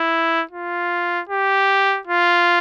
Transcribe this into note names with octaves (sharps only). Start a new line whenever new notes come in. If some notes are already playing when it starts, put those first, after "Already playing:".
Already playing: E4
F4
G4
F4